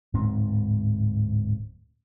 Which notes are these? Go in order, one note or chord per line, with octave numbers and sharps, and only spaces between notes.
D1 G#2 C4